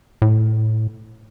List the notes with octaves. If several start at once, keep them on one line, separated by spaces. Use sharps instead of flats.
A2